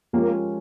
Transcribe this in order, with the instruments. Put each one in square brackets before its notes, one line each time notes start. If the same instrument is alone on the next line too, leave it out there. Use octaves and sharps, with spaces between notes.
[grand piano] F3 G#3 C#4 G4 A#4 [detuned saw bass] A#3